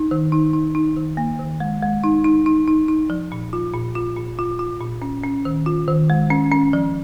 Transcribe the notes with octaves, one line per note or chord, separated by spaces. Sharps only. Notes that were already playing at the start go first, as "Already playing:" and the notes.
Already playing: D#4
D#3
D#4
D#4
D#4
D#3
A#3
D#3
G#3
G#3
D#4
D#4
D#4
D#4
D#4
F3
A#2
F4
A#2
F4
A#2
F4
F4
A#2
C#4
C#4
D#3
F4
D#3
G#3
C#4
C#4
F3